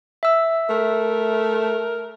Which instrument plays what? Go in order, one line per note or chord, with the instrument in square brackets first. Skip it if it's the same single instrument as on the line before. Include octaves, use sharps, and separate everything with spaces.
[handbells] E5 E6
[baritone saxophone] A3 [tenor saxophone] A#4